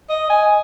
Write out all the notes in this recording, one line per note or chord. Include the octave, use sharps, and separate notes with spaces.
D#5
G#5